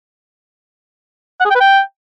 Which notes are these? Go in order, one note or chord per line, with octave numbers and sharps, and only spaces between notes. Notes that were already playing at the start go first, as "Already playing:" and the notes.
F#5
G#4
G5
B4
G5